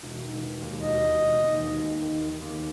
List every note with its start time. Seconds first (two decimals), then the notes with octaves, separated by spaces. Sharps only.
0.03 E1
0.22 D#3
0.42 E1
0.62 D#2
0.82 E1 D#5
1.02 E1
1.22 E1
1.42 D#2
1.62 D#3
1.82 D#2
2.01 D#3
2.21 D#3
2.42 D#2